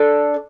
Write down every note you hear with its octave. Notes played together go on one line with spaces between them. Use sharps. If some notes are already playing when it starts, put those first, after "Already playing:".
Already playing: D4 A4